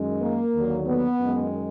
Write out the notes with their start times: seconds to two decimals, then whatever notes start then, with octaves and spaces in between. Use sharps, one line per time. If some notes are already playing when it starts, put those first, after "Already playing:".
Already playing: F#2 D#3 G#3
0.20 A#3
0.54 D#2 D3 F#3
0.87 B3
1.19 F#2 D#3 G#3